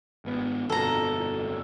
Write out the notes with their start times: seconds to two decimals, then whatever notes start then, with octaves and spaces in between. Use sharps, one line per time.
0.25 G#1 B3
0.70 G1 F2 B2 A4 A#5